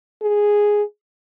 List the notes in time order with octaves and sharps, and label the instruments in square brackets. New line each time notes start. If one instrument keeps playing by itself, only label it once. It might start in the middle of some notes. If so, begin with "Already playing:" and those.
[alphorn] G#4